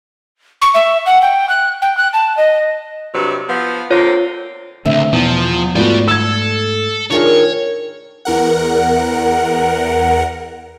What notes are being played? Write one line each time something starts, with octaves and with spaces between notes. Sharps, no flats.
C#6
E5
F#5
G5
F#6
G5
F#6
A5
D#5
G2 C3 F#3
F3 B3
D3 A#3 C4 F4 C#5
C#2 G2 D3 A3 C4 E5
E2 B2 F3
G#2 F3 G3 A3 B3 F#4 D5
A4 E6 G#6
D#3 D4 F4 G#4 A#4 C#5
E2 A#4 F#5